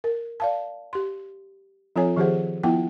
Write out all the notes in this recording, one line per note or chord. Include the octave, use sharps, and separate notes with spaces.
A#4
D5 F5 A5
G4 C6
F3 C4 F4 A4 C#5 G#5
D#3 F3 G4 G#4 C5 F#5
F3 B3 E4 F4 F#5 G5